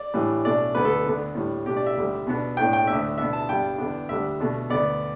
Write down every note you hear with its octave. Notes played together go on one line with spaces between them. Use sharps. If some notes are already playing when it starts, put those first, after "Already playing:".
Already playing: D5
A2 E3 G3 D4
B2 A3 D4 D5
D2 D3 B3 B4
A4
D2 D3 B3 D4
A2 G3 D4
B2 A3 D4 G4
D5
E5
D2 D3 G3
B2 B3 D4
A2 A3 D4 G5
G5
D2 D3 A3 D4 E5
B2 B3 D4 E5
A5
G2 G3 B3 D4 G5
E2 D3 B3 D4
D2 D3 G3 D4 E5
B2 A3 D4
D2 D3 B3 D5